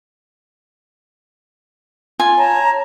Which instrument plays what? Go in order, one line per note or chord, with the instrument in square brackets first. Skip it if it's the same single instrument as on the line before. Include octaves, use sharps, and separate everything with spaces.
[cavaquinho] F4 G#5
[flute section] C#5 A5 A#5